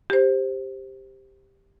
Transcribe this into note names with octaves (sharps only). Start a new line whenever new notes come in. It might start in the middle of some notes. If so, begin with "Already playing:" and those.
G4 C5